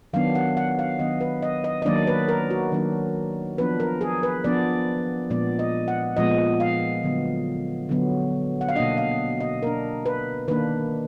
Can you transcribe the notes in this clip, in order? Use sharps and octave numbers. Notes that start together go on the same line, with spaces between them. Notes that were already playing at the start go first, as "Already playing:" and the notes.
D#3 F#3 B3 D4 F5
F#5
F#5
F5
D#3 F#3 B3 D4 D#5
B4
D#5
D#5
D#5
D#3 F#3 A#3 D4 D5
B4
A#4
F#4
D#3 F#3 A#3 D4
F3 B3 D4 B4
A#4
G#4
B4
F3 B3 D4 D5
A#2 F3 G#3 B3 D5
D#5
F#5
A#2 F3 G#3 B3 D#5
F5
D3 F#3 B3
D3 F#3 B3
F#5
F5
B2 A#3 D4 D#5
F5
D#5
B2 A#3 D4 A#4
B4
D#3 A#3 D4 B4